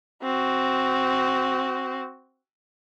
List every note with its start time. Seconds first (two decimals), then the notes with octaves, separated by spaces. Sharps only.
0.23 C4 F#4